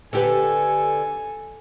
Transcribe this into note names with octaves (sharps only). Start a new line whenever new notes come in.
D3 G4 A4 B4 G#5